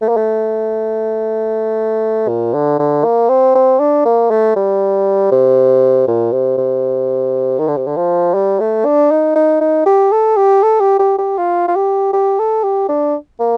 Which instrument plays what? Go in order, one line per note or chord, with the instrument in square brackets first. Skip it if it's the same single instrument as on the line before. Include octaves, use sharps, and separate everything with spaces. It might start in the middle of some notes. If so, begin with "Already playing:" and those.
[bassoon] A3
A#3
A3
A#2
D3
D3
A#3
C4
C4
D4
A#3
A3
G3
C3
A#2
C3
C3
D#3
D3
C3
D3
F3
G3
A3
D4
D#4
D#4
D#4
G4
A4
G4
A4
G4
G4
G4
F4
F4
G4
G4
A4
G4
D4
A#3